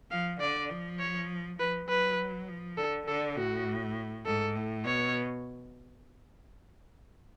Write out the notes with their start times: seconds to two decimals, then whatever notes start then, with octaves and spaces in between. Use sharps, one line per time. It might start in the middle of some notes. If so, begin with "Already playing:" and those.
0.11 F3 F5
0.40 D3 D5
0.70 F3
0.99 C#5
1.59 F3 B4
1.88 F#3 B4
2.48 F3
2.77 D3 A4
3.07 D3 A4
3.36 A2 F#4
4.25 G#2 A4
4.55 A2
4.85 B2 C#5